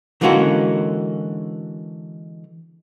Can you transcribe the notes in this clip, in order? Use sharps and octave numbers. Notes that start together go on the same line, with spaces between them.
D3 E3 G#3 A#3 C#4 F#4